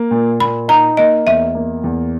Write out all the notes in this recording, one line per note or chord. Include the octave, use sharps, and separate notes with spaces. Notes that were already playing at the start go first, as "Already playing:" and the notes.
Already playing: A#3
A#2
A#2 B5
D#4 A#5
A#3 D#5
E2 E5
A#3
E2